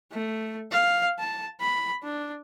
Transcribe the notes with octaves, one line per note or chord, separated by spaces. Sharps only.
A3
F5
A5
B5
D4